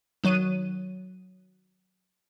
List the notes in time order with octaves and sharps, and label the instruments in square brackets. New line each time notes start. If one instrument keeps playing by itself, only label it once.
[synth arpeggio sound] D#3 F#3 C#5 D#7